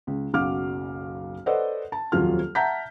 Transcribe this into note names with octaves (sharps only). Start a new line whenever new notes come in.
C#2
F#1 B1 F#4 F5 D6 F6
A4 B4 C5 D5 D#5 F#5
A5
D#1 F2 F3 F#3 F4 F6
E5 F#5 A5 A#5 G6 B6